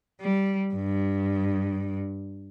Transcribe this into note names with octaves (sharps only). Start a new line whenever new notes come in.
G3
G2